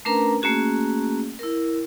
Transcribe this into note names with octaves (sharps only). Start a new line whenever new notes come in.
A3 C#4 D4 A#4 B4 A#5
A3 A#3 C#4 F#4 G#4
E4 A#4